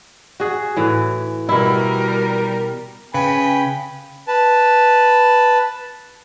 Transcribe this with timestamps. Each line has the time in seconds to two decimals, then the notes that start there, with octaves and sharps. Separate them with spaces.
0.40 F#4 G#4
0.77 A2 E3
1.49 B2 G3 E4 A#4
3.14 C#3 B4 G5 G#5
4.28 B4 A5